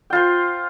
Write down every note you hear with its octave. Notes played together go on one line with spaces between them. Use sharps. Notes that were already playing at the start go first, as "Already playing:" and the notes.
F4 C5 G5